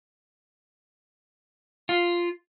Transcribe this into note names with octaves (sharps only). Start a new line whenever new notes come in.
F4